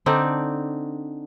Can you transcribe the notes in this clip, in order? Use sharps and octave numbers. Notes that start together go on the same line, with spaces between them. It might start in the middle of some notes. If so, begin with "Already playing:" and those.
D3 C4 D4 D#4